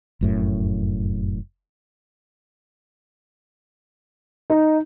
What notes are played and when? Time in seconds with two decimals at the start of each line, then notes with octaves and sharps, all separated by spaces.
0.21 F1 F#2 A2
4.50 D#4